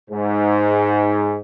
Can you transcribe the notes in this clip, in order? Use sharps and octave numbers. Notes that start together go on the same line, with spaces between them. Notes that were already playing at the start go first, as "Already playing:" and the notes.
G#2